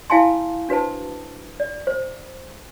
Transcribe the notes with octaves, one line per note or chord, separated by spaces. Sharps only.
E4 F5 G#5 A5 C6
D4 F#4 B4 C5 A5
D5
C5